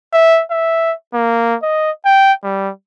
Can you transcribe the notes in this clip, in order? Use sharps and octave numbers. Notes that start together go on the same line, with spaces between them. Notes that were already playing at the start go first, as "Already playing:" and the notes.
E5
E5
A#3
D#5
G5
G3